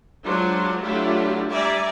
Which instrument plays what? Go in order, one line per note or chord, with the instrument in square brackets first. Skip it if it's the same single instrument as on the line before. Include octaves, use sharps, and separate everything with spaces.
[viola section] F#3 G#3 D4 F4 C5
F#3 A3 D4 E4 F4 G4
G3 D5 E5 G#5 A#5